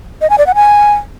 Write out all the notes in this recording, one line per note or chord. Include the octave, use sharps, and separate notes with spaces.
D#5
G#5
D5
F#5
G#5